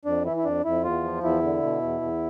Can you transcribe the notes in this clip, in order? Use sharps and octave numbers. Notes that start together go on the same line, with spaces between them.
F2 D4
E3 E4
E4
F2 D4
F2 E4
E2 F4
F3
E2 E4
D3
B2
E2
E2